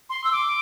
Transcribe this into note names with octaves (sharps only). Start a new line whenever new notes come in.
C6
E6
D6